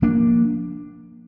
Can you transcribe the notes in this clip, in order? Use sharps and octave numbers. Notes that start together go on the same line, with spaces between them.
F3 A#3 D4